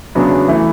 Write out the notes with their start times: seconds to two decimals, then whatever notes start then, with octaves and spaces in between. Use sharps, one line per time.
0.15 E2 C#3 F#3 B3 D4
0.48 E3 A3 E4